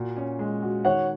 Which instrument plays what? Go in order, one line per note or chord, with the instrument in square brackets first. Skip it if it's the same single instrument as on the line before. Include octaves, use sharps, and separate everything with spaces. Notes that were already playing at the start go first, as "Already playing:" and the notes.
Already playing: [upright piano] A#2 F#4
C#4
G#3
F#4
[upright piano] D#3 [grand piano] C#5 F#5